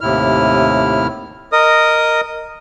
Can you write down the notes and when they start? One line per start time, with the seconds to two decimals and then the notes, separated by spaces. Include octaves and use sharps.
0.01 D#2 A2 C3 E4 F6
1.52 A#4 D#5 D#6